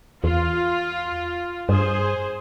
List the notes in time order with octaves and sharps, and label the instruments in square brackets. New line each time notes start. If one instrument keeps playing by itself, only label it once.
[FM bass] E2 [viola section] F4
[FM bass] G2 [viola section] G#4 C5